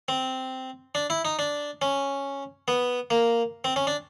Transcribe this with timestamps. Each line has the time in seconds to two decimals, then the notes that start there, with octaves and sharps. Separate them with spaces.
0.08 C4
0.95 D4
1.10 E4
1.25 D#4
1.39 D4
1.82 C#4
2.68 B3
3.10 A#3
3.64 C4
3.76 C#4
3.87 D4